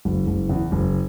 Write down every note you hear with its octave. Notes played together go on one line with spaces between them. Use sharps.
F#1
F#1
E2
F#1